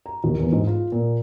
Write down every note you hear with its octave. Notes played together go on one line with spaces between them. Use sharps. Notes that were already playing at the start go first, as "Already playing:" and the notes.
A#5
D#2
E2
G#2
F4
A#2